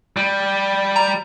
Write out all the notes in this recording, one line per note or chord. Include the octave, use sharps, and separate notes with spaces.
G3
A#5